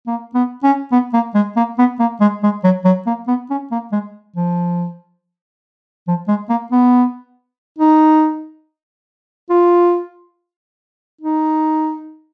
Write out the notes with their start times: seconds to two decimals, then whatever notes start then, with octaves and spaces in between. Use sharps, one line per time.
0.07 A#3
0.35 B3
0.63 C#4
0.92 B3
1.14 A#3
1.35 G#3
1.57 A#3
1.78 B3
2.00 A#3
2.21 G#3
2.43 G#3
2.64 F#3
2.85 F#3
3.07 A#3
3.28 B3
3.50 C#4
3.72 A#3
3.92 G#3
4.36 F3
6.08 F3
6.28 G#3
6.49 A#3
6.72 B3
7.79 D#4
9.50 F4
11.21 D#4